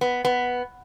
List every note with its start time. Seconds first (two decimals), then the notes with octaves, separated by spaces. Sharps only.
0.01 B3
0.25 B3